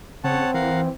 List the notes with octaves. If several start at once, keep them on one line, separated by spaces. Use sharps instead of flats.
C#3 C4 C#5 F#5 A5
E3 A#4 F5 F#5